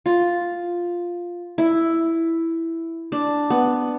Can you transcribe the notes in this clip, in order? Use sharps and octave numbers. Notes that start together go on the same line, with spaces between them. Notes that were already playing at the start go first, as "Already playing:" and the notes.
F4
E4
D4
B3